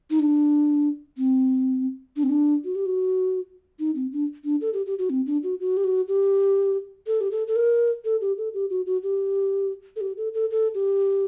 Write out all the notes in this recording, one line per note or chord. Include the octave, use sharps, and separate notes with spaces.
D#4
D4
C4
D4
C4
D4
F#4
G4
F#4
D#4
C4
D4
D4
A4
G4
G4
F#4
C4
D4
F#4
F#4
G4
F#4
G4
A4
G4
A4
A4
A#4
A4
G4
A4
G4
F#4
F#4
G4
A4
G4
A4
A4
A4
G4